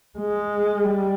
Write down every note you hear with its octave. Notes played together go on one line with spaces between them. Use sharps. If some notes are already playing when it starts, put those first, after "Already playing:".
G#3
G3